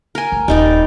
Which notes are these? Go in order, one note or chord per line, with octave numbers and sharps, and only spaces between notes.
A#4 G#5
D2
D#1 G3 D#4 D5